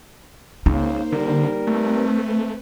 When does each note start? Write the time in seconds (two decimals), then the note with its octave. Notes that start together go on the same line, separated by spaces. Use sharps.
0.66 C#2 C#3 A#3 D#4 C5
1.12 D3 G3 A#4
1.67 A3 C4 B4